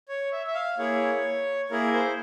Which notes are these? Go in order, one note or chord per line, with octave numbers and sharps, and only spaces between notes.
C#5
E5
E5
F5
A#3 E4 G#4 C#5
A#3 E4 G#4 A#4
C5